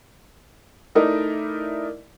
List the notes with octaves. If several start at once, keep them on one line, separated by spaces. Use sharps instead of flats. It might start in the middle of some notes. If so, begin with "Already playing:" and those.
A3 D#4 E4 A#4 D5 D#5